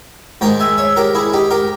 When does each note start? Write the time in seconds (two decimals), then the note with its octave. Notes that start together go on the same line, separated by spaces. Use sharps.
0.41 G#2 D#3 G#3 G5 A#5
0.60 E5 G#5
0.78 C#5 E5
0.96 G4 A#4
1.15 E4 G#4
1.33 D#4 G4
1.50 G4 A#4